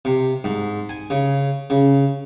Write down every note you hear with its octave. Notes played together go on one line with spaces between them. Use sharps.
C3
G#2
G#5
C#3
C#3